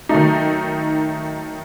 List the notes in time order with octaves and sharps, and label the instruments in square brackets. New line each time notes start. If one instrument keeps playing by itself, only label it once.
[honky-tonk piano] D#3 F#3 A3 D#4